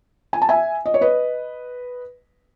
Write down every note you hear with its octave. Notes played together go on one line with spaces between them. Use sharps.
G#5
A5
E5 G#5
D#5
C#5
B4 D#5